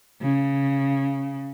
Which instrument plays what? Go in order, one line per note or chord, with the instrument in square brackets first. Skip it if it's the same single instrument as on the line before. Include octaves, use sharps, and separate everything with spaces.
[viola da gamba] C#3